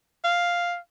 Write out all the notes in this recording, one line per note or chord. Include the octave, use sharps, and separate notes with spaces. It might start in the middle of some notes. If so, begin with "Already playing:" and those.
F5